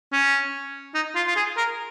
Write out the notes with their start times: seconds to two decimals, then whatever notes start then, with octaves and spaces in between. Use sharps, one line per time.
0.13 C#4
0.95 D#4
1.15 F4
1.28 F4
1.36 G#4
1.57 A#4